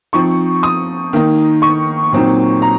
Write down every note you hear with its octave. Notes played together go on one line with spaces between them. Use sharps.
F3 C4 D#4 C#6
D#6
D#3 A#3 D#4
C#6
A#2 F#3 C4 D#4
A#5